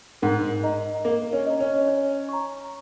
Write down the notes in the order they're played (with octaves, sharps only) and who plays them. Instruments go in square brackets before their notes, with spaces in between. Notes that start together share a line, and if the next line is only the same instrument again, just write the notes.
[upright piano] G#2 [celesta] A#4
[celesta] D#5 A#5
[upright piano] A#3 [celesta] A#4
[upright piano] C#4
[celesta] D#5 A#5
[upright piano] C#4
[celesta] C#5
A#5 C#6